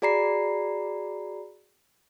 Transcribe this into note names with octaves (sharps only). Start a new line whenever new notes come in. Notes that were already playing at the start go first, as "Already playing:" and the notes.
F#4 G#4 D5 A#5 B5 C7